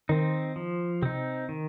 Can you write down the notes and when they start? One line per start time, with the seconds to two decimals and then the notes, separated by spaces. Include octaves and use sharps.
0.09 D#3 C4 D#4
0.56 F3
1.02 C3 C4 D#4
1.49 D#3